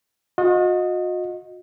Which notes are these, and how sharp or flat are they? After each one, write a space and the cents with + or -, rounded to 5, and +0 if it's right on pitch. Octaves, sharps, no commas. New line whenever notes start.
F#4 -45 D#5 +0